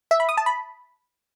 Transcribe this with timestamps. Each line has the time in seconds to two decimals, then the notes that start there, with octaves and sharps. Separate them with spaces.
0.11 E5
0.20 B5
0.29 D#6
0.37 A5
0.46 B5